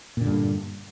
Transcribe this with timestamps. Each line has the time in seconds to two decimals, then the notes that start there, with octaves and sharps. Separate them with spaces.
0.17 A#2
0.21 D3
0.26 G2